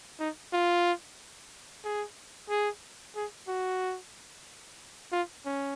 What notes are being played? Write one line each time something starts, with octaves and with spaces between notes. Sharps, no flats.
D#4
F4
G#4
G#4
G#4
F#4
F4
C#4